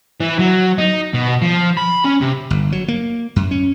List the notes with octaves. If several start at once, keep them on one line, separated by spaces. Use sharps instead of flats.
E3
F#3
D#4
B2
F3
B5
C#4
C3
G1
F#3
A#3
F#2
C#4